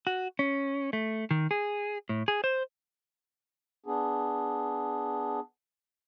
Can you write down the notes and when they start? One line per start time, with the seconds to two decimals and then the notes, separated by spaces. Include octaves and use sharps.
0.07 F#4
0.39 C#4
0.93 A3
1.31 D#3
1.51 G#4
2.09 A2
2.28 G#4
2.44 C5
3.86 B3 D4 G#4